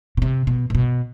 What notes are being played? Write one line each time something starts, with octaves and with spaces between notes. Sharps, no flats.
B2
C3
B2
A#2
B2